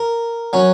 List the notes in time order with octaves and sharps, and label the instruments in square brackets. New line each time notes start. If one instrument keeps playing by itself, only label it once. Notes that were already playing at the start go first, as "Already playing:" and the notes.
Already playing: [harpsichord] A#4
F#3 C#4